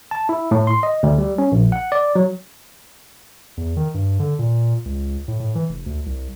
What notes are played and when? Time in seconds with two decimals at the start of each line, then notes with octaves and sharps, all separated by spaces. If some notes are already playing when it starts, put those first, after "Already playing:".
0.11 A5
0.29 E4
0.51 A2
0.67 C6
0.83 D#5
1.03 D2
1.18 G3
1.38 C#4
1.52 A#1
1.72 F#5
1.92 D5
2.15 F#3
3.57 E2
3.77 D#3
3.94 G2
4.19 D3
4.39 A#2
4.85 C#2
5.28 A2
5.40 A2
5.55 E3
5.69 F1
5.86 D2
6.06 C2